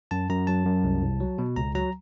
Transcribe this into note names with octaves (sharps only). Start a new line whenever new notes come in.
F#2 A5
F#2 A#5
F#3 A5
F#2
C2
C2
F#3
B2
C#2 A#5
F#3 A#5